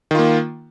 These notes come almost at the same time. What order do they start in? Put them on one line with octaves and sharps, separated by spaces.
D#3 F4 A#3